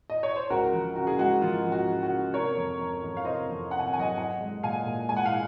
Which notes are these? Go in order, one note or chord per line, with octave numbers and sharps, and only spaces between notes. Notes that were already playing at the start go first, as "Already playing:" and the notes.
D#5
C#5
C5
C#2 F#4 A#4
F3
C#3 F#4
G#4
G#3 F#4
F3 F4
F3
F#4
F3
F#4
C#3
C3 A#4 C#5
F2
F2
F2
F5
C3 C5 D#5
F2
C3 F#5
G#5
F#5
F#3 G#5
D#5 F#5
C4 D#5 F#5
G#3
A#2 F5 G#5
A#2
G#3 G#5
F#5
F5 G#5